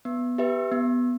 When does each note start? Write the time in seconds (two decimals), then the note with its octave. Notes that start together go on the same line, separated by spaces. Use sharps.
0.05 B3
0.38 G4 B4 E5
0.72 B3